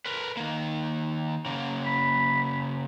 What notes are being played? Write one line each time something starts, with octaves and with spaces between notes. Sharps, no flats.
A#4 B4
D#3 A#3
C#3 A#3
B5